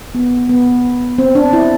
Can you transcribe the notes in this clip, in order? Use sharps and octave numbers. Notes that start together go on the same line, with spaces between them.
B3
B3
C4
D4
E4